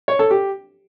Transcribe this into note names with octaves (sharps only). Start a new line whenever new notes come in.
C#5
A4
G4